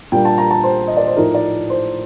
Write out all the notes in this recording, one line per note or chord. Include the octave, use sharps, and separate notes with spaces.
A#2 G3 A#3 D4 G5
A5
A#5
A5
C5
D#5
D5
C5
A2 F3 A3 D#4 A#4
D5
C5